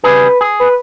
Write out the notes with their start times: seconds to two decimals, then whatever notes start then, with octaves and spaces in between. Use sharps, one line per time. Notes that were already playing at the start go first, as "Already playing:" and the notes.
0.04 C#3 G3 G#4 B4
0.41 G#4
0.60 B4